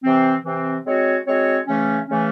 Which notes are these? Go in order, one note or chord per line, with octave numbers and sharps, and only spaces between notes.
C3 E3 C4
C3 E3 C4
G#3 C4 F#4 C#5
G#3 C4 F#4 C#5
C#3 E3 A3 C#4
C#3 E3 A3 C#4